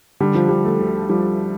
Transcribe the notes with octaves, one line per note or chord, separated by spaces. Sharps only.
D3 G3
F3
D3 G3
A3
D2
F3 G3